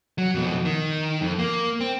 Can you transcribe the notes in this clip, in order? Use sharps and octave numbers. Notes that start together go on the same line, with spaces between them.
F#3
F2 B2
D#3
F2
A#3
C4